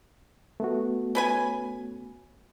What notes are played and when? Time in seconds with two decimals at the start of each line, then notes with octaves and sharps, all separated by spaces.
0.60 A3 B3 F#4
1.15 C#4 B4 G#5